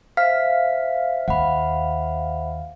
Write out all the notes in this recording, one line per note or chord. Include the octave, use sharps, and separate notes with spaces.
C5 E5 F5 B6
D#2 F#5 B5